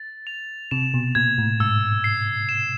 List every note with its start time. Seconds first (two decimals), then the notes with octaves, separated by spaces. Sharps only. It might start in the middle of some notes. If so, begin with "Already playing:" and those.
Already playing: A6
0.27 F7
0.71 C3 E7
0.94 B2
1.15 A#2 G#6
1.38 A2
1.60 G#2 E6
2.04 C7
2.49 E7